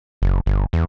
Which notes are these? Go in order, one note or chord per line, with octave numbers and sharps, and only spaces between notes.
F#1
G1
E2